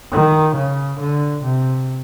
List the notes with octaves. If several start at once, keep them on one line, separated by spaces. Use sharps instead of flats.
D#3
C#3
D3
C3